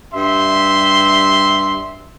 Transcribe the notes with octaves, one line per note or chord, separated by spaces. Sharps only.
G2 G3 E5 C6